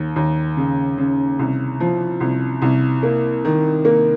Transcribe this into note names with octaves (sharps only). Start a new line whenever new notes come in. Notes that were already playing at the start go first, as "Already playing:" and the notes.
Already playing: D#2
D#2
C#3
C#3
C2
F3
C2
C2
A#3
D#3
A#3